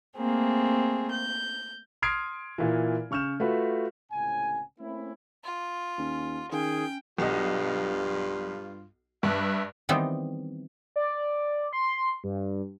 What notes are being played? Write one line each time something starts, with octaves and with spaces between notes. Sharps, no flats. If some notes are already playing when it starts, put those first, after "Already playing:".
A3 A#3 C4 G#4
G6
C6 D#6 F6 G#6 C7 D7
A#2 E3
C#3 C#6 F6 G6 E7
A3 F4 F#4 B4
C#2 A2 C3 C#4 G#5
A3 A#3 C4 C#4 E4
F4
D#2 C#4
D#3 C#4 G#4 G5
B1 G2 F4 D#5
G2 D4 B4 E5
D#3 E3 G3 B3 C4 D#4
D5
C6
G2